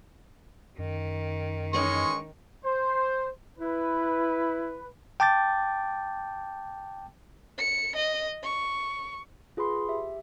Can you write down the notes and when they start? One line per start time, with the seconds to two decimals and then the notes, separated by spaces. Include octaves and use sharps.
0.79 F#2 D#3
1.73 E3 G#3 C#4 D#4 C#6
2.64 C5
3.58 E4 B4
5.20 G5 A5 D6 G6 A6
7.58 C#7
7.96 D#5
8.43 C#6
9.57 F4 G#4 B4 B5 C6
9.88 G4 E5